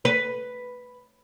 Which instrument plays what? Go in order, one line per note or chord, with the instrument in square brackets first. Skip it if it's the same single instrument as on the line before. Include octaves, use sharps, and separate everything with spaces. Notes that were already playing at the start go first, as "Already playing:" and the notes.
[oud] B4